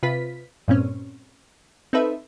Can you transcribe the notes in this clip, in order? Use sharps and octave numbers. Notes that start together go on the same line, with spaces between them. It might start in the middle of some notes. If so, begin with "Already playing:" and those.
C3 F4 B4 B6
G2 A#2 C4 C#4
C4 D#4 A4 B4 E5